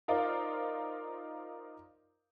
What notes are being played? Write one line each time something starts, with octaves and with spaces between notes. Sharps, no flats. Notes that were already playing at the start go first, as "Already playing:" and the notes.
D#4 F4 A#4 C5 D5